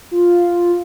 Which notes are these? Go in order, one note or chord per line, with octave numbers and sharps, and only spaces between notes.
F4